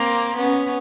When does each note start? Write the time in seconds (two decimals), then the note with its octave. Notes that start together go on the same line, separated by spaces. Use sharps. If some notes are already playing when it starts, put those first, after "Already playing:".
Already playing: A#3 C4
0.37 B3 C#4